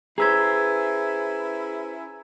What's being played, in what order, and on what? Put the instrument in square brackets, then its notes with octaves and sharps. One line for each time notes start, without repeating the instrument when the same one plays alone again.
[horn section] C#4 E4 [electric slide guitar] G#4 B4 C5 [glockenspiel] A#5 E6 G#6